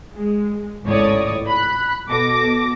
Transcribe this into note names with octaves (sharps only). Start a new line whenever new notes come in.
G#3
G#1 C#2 A2 C#5 D5 D#6
B5 F#6
B2 A4 D6 A#6